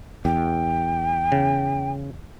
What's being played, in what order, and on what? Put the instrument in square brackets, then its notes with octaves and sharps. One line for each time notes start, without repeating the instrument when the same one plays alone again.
[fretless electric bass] E2 [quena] G5
[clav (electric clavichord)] C#3